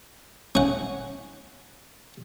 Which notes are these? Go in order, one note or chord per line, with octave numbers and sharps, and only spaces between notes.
C#4 F#5